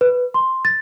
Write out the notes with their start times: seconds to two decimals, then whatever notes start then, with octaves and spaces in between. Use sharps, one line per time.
0.01 B4
0.34 C6
0.65 A6